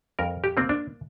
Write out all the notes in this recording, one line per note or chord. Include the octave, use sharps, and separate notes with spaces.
F2 A#4
G4
A#3 C4
D4